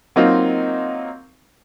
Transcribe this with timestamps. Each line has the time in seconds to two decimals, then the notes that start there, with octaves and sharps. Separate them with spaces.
0.16 F#3 A#3 C4 D#4 F4